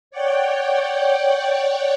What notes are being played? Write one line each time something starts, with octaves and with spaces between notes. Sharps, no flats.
C#5 D5 F#5 G5